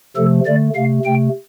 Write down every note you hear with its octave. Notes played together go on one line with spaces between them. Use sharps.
C3 F3 A3 A4
D3 A3 D5
C3 A3 F5
C3 A3 G5